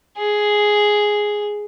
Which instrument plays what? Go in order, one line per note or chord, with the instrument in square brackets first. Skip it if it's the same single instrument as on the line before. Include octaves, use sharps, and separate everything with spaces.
[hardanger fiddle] G#4